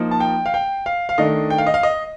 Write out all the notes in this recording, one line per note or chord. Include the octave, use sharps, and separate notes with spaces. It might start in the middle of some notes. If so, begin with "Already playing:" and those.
Already playing: F3 A#3 D#4
A5
G5
F5
G5
F5
F5
D#3 A3 D4 D#5
G5
F5
D#5
F5
D#5